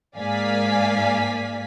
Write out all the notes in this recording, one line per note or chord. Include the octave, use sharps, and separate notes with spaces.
G#2 A#3 D5 F5 G#5 B6